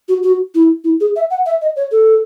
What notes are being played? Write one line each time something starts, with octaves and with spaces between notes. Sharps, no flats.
F#4
F#4
E4
E4
G#4
E5
F#5
E5
D#5
C#5
A4